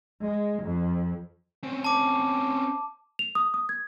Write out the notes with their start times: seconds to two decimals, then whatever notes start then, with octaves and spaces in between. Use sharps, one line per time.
0.22 G#3
0.63 F2
1.63 C4 C#4
1.84 A5 D6
3.19 F7
3.35 D#6
3.54 D#6
3.69 G#6